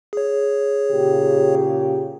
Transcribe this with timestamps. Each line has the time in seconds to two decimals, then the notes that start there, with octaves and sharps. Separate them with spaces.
0.13 G#4 C#5
0.90 A#2 C#3 G4